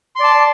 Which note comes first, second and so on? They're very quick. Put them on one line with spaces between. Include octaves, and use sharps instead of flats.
C6 D5 A5